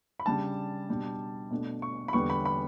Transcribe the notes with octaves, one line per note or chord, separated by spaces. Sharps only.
B5
C#3 G3 D4 A5
B2 G3 D4
B2 A3 D4
C#6
B5
E2 D3 G3 B3 C#6
B5
B5